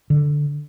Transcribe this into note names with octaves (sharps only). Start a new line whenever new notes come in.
D3